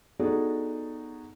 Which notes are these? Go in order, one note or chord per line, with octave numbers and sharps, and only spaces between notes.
B3 D4 D#4 F#4 G#4 A4